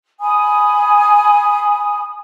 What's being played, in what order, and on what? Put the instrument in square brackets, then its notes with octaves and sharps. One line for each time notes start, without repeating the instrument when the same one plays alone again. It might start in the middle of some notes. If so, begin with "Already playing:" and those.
[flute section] G#5 B5 D#6